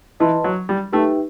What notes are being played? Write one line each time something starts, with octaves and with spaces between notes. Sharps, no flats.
E3 B4 D#5 A5 C6
F#3
G3
A3 D#4 G4 B4 E5 G5